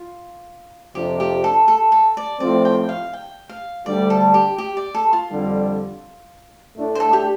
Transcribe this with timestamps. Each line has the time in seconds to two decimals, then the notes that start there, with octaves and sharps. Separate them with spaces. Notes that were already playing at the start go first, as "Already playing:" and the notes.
Already playing: F4
0.95 F2 C3 F3 D4 G4
1.20 G4
1.44 A4
1.68 A4
1.92 A4
2.17 D5
2.40 A2 F3 A3 C4 D5
2.65 G5
2.89 F5
3.13 G5
3.49 F5
3.86 D2 D3 G3 D5
4.10 A4
4.34 G4
4.58 G4
4.77 D5
4.95 A4
5.13 F4
5.30 F2 D3 G3
6.76 A2 A3 D4
6.95 C5
7.00 A4
7.13 G4